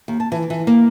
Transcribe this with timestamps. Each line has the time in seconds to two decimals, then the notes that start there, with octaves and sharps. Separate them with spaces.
0.08 D#2
0.20 A5
0.32 E3
0.50 E3
0.67 A#3